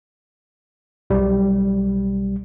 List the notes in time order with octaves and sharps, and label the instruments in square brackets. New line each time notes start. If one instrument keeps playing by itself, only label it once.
[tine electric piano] B1 G3